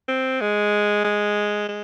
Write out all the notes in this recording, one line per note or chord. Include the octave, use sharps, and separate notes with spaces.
C4
G#3
G#3
G#3